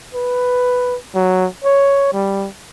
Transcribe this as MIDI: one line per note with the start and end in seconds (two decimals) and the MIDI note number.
0.14 0.96 71
1.15 1.46 54
1.64 2.10 73
2.13 2.48 55